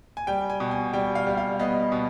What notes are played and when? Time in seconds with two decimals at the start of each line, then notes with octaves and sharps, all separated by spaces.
0.17 G#5
0.27 G3 G5
0.50 G#5
0.60 B2
0.71 G#5
0.93 G3 G5
1.15 F5
1.27 G3
1.37 F5
1.59 B3 D#5
1.92 B2